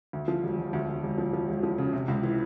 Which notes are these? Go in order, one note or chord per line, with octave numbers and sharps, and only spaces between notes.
D2
F3
E1
E1
D2
D2
E1
F3
F3
E1
F3
C#3
C3
C#2
E3